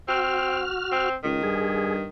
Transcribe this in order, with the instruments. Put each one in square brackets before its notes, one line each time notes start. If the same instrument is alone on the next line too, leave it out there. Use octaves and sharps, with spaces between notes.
[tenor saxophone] C4 [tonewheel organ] F#4 F6
[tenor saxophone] C4
[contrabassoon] C#2 [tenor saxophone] D#3
[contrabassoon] G2 [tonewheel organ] G#4